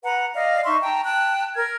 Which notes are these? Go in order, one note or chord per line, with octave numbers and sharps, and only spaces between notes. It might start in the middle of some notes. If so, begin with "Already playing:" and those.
B4 F#5 A#5
D5 D#5 F5
D#4 E5 C6 C#6
G5 A5 A#5
G5 A5 F#6
A#4 F6 G#6